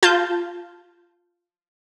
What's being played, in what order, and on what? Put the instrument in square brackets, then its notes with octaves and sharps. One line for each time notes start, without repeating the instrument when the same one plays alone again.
[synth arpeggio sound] F4 A5 G6